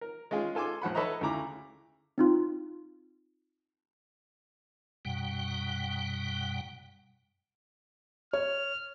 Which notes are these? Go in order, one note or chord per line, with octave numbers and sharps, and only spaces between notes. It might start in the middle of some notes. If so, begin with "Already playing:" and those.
A#4
G#3 C#4 F4 G#4
F4 A4 G#5 C6 D6
A#1 F3 F#5 B5
A4 B4 C#5 D#5 E5 A#5
D2 C#3 E4 A#5 D6
C4 D#4 F4
F#2 B2 G3 F#5 G5
C#5 F6